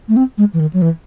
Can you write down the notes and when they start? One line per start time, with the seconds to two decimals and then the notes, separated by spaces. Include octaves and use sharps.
0.09 A3
0.16 C4
0.38 G#3
0.54 E3
0.60 D#3
0.73 F#3
0.82 E3